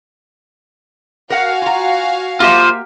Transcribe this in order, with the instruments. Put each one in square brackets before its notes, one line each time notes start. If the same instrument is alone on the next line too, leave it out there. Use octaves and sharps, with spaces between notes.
[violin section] F#4 F5 G#5 [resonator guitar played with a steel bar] A#4 F#5
[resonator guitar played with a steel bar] F4 A#5
[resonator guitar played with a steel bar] A#3 G4 E5 [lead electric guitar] F4 C5